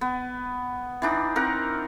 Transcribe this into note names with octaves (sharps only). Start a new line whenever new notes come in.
B3
E3 D4 D#4
C4 A#4 F#5